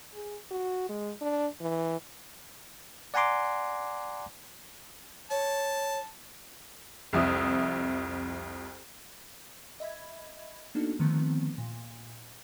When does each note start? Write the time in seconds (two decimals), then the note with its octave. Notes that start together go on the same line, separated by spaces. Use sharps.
0.14 G#4
0.51 F#4
0.89 G#3
1.21 D4
1.61 E3
3.14 D5 F#5 G#5 A#5 C6 D6
5.31 C#5 A5
7.13 C2 F2 E5 D#6
9.80 D#5 E5 B5 G#6
10.75 A#3 B3 D4 D#4 F#4 A4
10.99 D3 D#3 F3 A3 B3 C4
11.58 A#2